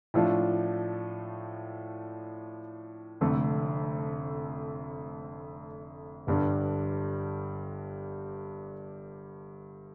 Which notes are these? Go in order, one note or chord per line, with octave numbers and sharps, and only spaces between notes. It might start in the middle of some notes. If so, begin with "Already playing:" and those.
A2 F3 A3 D4 F4
F1 F2 D3 A3
G1 G2 D3 G3 D4